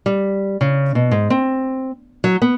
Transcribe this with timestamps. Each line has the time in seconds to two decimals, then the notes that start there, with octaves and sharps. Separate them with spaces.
0.06 G3
0.61 C#3
0.95 B2
1.11 G#2
1.30 C4
2.24 F#3
2.42 B3